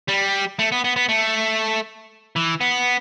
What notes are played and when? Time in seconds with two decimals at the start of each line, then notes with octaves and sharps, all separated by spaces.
0.09 G3
0.59 A3
0.72 B3
0.84 B3
0.96 B3
1.09 A3
2.36 E3
2.61 B3